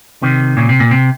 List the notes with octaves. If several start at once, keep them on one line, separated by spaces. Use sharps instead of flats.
C3 D#3
A#2 C#3
C3
A#2
C3